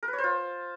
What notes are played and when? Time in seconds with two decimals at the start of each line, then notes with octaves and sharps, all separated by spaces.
0.03 A#4
0.08 B4
0.13 C#5
0.18 C5
0.24 F4